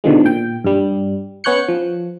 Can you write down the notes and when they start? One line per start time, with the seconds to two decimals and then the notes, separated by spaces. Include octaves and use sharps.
0.04 B2 D3 D#3 F3 G#3
0.25 A#2 G5
0.64 G2 G3
1.44 B3 C#4 C#5 F#6 G6 C#7
1.68 F3